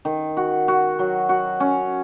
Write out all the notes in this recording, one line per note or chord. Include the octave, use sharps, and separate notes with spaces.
D#3
F#4
F#4
F#3
F#4
C#4